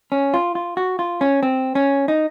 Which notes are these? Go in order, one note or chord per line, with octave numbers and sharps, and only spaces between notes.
C#4
F4
F4
F#4
F4
C#4
C4
C#4
D#4